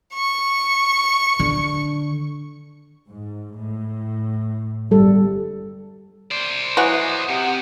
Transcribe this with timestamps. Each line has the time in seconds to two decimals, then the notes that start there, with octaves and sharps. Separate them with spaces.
0.14 C#6
1.39 D3
3.10 G#2
3.58 A2
4.91 G1 G3 A4
6.32 C5 D5
6.77 E3 F#3 F#4 D#5
7.28 C3 G4 F#5